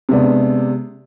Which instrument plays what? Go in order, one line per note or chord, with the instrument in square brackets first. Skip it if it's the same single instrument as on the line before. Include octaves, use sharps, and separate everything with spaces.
[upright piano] C3 G#3 B3 D4